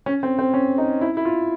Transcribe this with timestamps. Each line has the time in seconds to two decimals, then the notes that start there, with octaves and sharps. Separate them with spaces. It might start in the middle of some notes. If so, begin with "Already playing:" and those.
0.06 C#4
0.23 C4
0.39 C4
0.54 C#4
0.78 D#4
1.01 E4
1.17 E4
1.25 F4